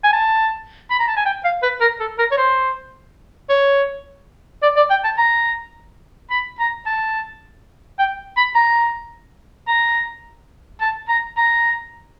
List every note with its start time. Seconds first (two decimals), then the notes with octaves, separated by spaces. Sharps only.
0.04 G#5
0.13 A5
0.90 B5
0.99 A#5
1.08 A5
1.16 G#5
1.25 G5
1.44 F5
1.62 B4
1.81 A#4
2.00 A4
2.18 A#4
2.31 C#5
2.37 C5
3.49 C#5
4.62 D5
4.76 D5
4.90 G5
5.04 A5
5.18 A#5
6.30 B5
6.59 A#5
6.86 A5
7.99 G5
8.37 B5
8.55 A#5
9.68 A#5
10.81 A5
11.08 A#5
11.37 A#5